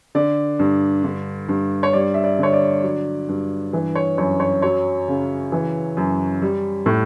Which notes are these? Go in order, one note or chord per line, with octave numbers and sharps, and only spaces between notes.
D3 D5
G2
D3
G2
C#5
G3 D5
E5
D5
D3 C#5
D5
F#3
G2
E3
C#5
F#2 C#5
C#5
F#3 C#5
C#3
E3
F#2
G3
A2